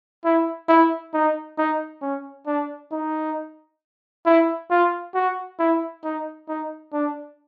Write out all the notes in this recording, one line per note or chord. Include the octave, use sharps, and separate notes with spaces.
E4
E4
D#4
D#4
C#4
D4
D#4
E4
F4
F#4
E4
D#4
D#4
D4